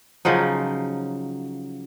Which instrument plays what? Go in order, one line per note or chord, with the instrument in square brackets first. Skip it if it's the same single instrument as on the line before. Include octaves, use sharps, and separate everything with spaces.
[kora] C#3 F3 F#3 D#4